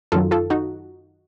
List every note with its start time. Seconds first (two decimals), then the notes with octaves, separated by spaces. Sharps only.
0.12 F#2 D#3 F#3 F4 A4
0.31 F4 A4
0.50 D#4 F#4